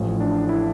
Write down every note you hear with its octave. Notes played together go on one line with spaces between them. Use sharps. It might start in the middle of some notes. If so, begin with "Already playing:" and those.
Already playing: A1 A2 F3
D4
E4